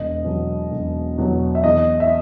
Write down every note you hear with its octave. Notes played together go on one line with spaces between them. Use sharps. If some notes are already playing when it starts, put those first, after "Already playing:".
Already playing: E1 D#5
E2 B2 F#3
E1
E2 B2 F#3
E5
E2 D#5
E5